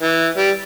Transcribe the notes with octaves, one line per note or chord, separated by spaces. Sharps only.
E3
G3